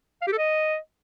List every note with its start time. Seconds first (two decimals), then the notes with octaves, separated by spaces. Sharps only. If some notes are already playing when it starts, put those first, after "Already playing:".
0.22 F5
0.27 G4
0.33 A4
0.38 D#5